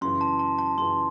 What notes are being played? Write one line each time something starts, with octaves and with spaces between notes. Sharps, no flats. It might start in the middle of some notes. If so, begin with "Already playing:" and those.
F#2 C#3 E3 C6
A5
A5
A5
F#2 C#3 E3 C6